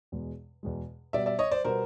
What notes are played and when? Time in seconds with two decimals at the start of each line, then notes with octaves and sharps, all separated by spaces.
0.12 E2 B2 G#3
0.63 E2 B2 G#3
1.13 B2 G3 B3 D5 E5
1.26 D5 E5
1.39 C#5 D#5
1.51 C5 D5
1.64 B2 G3 B3 A#4 C5